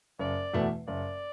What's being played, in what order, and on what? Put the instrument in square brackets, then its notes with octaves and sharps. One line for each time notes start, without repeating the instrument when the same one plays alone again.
[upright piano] F#1 [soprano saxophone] D5
[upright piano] E2 B2 A3 E4
[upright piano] F#1 [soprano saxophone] D5